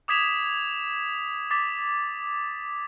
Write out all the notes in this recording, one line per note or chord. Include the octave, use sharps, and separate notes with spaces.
D6 D#6 G#6 B6 E7 F7
D6 A6 B6